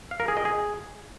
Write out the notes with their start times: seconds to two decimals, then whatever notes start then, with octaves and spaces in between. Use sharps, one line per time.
0.11 F5
0.20 A#4
0.28 G#4
0.37 D#5
0.45 G#4